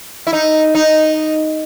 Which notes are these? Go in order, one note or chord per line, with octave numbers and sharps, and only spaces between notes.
E4
D#4
D#4